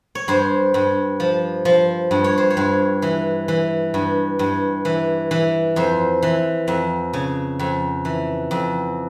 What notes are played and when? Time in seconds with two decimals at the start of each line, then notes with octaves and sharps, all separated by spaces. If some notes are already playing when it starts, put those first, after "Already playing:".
0.15 C#5
0.28 G2 C5
0.74 G2
1.20 F3
1.65 F3
2.11 G2
2.24 C#5
2.38 C5
2.50 C#5
2.57 G2
3.02 E3
3.48 E3
3.94 G2
4.39 G2
4.85 E3
5.31 E3
5.76 F2 C5
6.23 E3
6.68 F2
7.13 C#3
7.59 F2
8.05 E3
8.51 F2